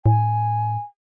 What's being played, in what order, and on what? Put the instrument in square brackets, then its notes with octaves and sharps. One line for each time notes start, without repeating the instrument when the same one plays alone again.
[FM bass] A2 [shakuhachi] G#5